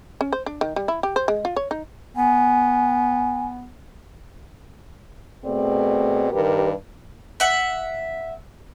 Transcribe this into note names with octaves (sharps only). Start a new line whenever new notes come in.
C#4
C5
D4
D#3
G3
E4
G4
C5
G#3
F4
C#5
D#4
B3 G#5
B2 A3 C4 G#4 D5
G2 D#3 G4 A#4 B4
E5 F#5